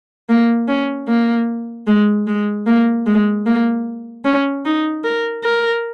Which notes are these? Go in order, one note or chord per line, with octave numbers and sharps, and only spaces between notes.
A#3
C#4
A#3
G#3
G#3
A#3
G#3
A#3
C#4
D#4
A#4
A#4